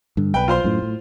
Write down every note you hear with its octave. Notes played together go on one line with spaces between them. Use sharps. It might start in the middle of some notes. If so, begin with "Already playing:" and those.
G2 D3
B1 B4 G5
F4 C5 C6
F#2 A2
A2